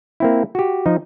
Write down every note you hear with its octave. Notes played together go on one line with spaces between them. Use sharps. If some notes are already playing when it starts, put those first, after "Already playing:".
A#3 C4 E4
F#4 G4
F3 D#4